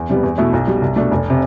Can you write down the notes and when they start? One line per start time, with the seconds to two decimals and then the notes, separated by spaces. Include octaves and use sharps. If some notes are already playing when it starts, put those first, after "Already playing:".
Already playing: E2
0.09 C3 G3 B3
0.23 E2
0.38 B2 A3 E4
0.53 B1
0.67 B2 G3
0.82 C2
0.96 B2 A3 D4
1.11 F1
1.30 C3